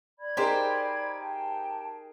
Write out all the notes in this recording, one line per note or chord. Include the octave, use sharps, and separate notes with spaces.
D5 B5 G#6
D#4 G4 G#4 A#4 C5
G5 A5